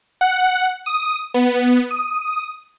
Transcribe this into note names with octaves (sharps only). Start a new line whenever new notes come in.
F#5
D#6
B3
D#6